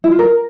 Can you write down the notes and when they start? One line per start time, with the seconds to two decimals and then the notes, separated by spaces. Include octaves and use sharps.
0.04 E4
0.11 F4
0.19 A#4